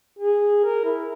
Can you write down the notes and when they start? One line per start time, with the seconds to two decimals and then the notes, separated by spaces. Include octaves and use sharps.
0.19 G#4
0.65 A#4
0.85 E4